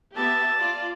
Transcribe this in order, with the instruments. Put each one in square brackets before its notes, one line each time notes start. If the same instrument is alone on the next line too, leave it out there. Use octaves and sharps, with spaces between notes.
[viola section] B3 G4 E5 [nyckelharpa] A5
[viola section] F4 D5